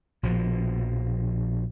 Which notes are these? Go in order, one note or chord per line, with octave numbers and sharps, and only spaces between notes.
A#1 B2 F3